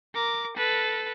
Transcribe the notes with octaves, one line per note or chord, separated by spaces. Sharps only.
A#4 D6
A4 B4